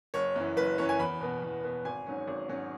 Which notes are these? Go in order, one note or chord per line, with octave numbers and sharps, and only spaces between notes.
F#1 C#5
F#2 E3
F#1 B4
F#2 E3 C#5
G#5
E2 B5
B2 B3
E2
B2 B3
G#1 G#5
G#2 F#3 C#4
G#1
G#2 F#3 C#4